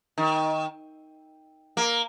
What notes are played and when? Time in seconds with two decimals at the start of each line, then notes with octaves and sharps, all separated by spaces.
0.18 D#3
1.77 A#3